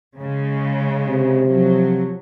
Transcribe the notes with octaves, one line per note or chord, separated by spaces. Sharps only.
C#3 G#3
C3
F3 F#3